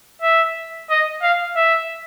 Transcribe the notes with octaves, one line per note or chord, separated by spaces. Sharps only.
E5
D#5
F5
E5